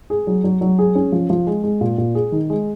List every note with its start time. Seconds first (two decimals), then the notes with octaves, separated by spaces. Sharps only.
0.10 G#4
0.27 F#3
0.44 F#3
0.61 F#3
0.79 G#4
0.95 C#4
1.12 F3
1.30 F3
1.47 G#3
1.64 G#3
1.81 A#2
1.98 A#2
2.15 G#4
2.32 D#3
2.50 G#3